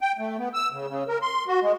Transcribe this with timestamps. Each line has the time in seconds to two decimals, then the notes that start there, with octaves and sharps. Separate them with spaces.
0.01 G5
0.19 A3
0.39 B3
0.54 E6
0.72 C#3
0.88 C#3
1.08 A#4
1.22 C6
1.48 F#4
1.62 G#3